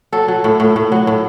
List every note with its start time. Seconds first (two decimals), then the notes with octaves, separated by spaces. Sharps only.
0.12 F#3 A4
0.28 F#3
0.44 A2
0.60 A2
0.76 A2
0.92 F#3
1.07 A2